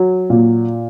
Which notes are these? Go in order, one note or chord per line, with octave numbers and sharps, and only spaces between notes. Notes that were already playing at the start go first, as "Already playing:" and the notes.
Already playing: F#3
A#2